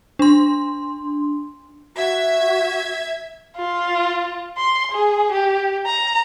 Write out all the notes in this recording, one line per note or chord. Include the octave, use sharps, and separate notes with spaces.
D4 C6
F#4 E5 G#6
F4
C6
G#4
G4
A#5